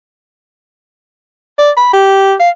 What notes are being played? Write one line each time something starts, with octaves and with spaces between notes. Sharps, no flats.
D5
B5
G4
F5